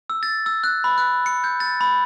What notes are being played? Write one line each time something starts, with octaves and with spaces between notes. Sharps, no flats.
E6
A6
E6
F#6
B5
F#6
C#7
G6
A6
B5